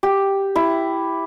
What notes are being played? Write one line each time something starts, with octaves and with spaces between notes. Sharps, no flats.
G4
E4